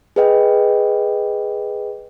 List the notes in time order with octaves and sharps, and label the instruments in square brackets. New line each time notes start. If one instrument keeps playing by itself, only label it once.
[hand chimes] G#4 B4 D#5 G5